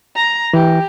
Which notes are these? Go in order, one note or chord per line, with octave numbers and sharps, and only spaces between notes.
A#5
E3 G4